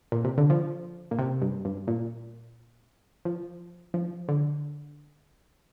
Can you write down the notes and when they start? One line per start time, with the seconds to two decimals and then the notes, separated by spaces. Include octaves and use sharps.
0.12 A#2
0.25 C3
0.38 D3
0.50 F3
1.11 A#2
1.19 C3
1.42 G2
1.65 G2
1.87 A#2
3.25 F3
3.94 F3
4.29 D3